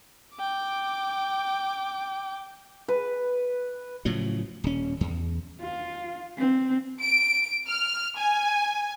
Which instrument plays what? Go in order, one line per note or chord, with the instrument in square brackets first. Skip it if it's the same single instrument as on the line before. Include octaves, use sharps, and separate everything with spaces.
[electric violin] G5 D6
[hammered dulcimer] B4
[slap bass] A2 C#3 F3 F#3
D#1 C#4
E2
[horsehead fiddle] F4
C4
[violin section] D7
F6
G#5